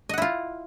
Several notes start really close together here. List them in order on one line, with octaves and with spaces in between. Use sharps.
D#5 F#5 E4 F4